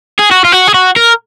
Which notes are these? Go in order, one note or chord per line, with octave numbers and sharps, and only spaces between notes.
G#4
F#4
F4
F#4
G#4
F#4
A#4